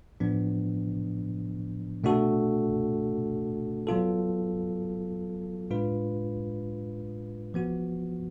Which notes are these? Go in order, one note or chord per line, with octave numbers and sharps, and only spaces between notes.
A2 F3 B3 D4
B2 A3 D4 F#4 A4
F#3 B3 F4 A4
A2 G#3 D4 F4 B4
F3 B3 F#4